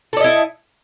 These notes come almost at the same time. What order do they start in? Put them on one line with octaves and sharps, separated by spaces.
A4 D5 D#5 E4